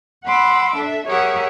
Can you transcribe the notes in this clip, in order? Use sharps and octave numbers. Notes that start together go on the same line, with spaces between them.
F#5 B5 C6 D6 E6
D4 A4 E5
G4 G#4 A#4 C#5 E5 F#5